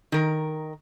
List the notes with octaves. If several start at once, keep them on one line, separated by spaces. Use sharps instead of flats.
D#3 A#4